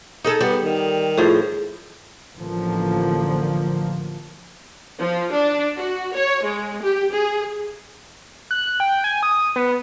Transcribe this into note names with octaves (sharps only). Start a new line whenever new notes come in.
D#4 G#4 A4
G3 B3
D#3
A2 F3 G#4 F5
A1 D3 F3 A#3
F3
D4
F#4
C#5
G#3
G4
G#4
F#6
G5
G#5
D#6
B3